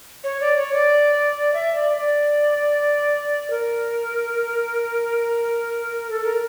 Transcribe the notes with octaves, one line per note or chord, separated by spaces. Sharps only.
C#5
D5
C#5
D5
E5
D5
D5
A#4
A4
A#4